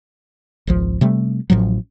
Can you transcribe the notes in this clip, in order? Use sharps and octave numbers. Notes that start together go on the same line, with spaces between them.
G#1 C#2 F3
C3 G3 A3
A1 A2 F3 F#3